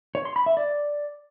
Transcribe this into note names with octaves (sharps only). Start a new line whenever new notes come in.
C#5
C6
B5
E5
D5